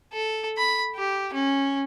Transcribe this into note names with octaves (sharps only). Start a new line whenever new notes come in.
A4
B5
G4
C#4